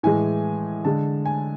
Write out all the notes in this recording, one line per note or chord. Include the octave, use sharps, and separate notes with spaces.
A2 E3 G#3 G#5
D3 G#3 A5
G#5